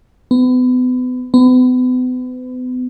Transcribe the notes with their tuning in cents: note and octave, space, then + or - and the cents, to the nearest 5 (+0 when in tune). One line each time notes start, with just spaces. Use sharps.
B3 +35
B3 +40